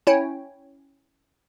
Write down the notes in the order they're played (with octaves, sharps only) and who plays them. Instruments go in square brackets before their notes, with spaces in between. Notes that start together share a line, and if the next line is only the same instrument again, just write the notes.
[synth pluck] C#4 E4 C#5 G5